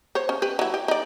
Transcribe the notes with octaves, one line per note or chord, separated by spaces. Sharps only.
C5 C#5
C#4
G4 B4
F#3 E4
G4
D#4 D5